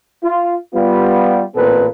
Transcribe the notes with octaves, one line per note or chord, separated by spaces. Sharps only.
F4
G3 B3 F4
A1 A#2 B3 C4 A4 B4